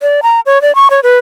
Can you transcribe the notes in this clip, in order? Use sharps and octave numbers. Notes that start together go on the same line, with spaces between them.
D5
A#5
C#5
D5
C#6
C#5
B4